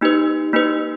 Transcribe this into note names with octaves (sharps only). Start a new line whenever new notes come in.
A#3 D#4 G4 B4
A#3 D#4 G4 B4